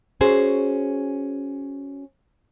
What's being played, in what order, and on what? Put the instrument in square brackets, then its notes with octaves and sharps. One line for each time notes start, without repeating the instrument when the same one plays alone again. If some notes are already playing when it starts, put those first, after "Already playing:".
[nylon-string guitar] C#4 F#4 G#4 C5